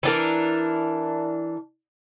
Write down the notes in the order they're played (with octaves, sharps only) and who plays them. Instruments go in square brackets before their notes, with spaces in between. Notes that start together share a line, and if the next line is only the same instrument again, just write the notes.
[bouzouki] E3 D4 A#4